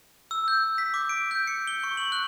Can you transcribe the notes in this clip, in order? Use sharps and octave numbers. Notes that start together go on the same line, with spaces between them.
E6
G6
B6
D6
D7
G6
C#7
G7
C#6
F#7
F#6